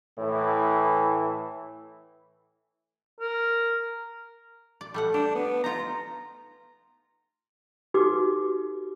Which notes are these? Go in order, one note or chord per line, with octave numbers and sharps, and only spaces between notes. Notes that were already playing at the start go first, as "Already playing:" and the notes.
A2 E3
A#4
D5
G3 A3 F#5
D4 G4
B3
D#4 F4 A#5
D#4 F#4 G4 A4 B4 D6